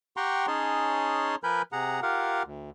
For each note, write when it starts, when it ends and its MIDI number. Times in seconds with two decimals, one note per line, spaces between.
0.17 0.46 67
0.17 0.46 78
0.17 0.46 79
0.17 0.46 82
0.17 0.46 84
0.17 0.46 85
0.47 1.35 61
0.47 1.35 63
0.47 1.35 68
0.47 1.35 73
0.47 1.35 81
0.47 1.35 84
1.44 1.62 53
1.44 1.62 70
1.44 1.62 71
1.44 1.62 80
1.44 1.62 83
1.44 1.62 91
1.72 2.00 48
1.72 2.00 68
1.72 2.00 78
1.72 2.00 82
2.03 2.43 65
2.03 2.43 67
2.03 2.43 70
2.03 2.43 77
2.03 2.43 78
2.45 2.70 38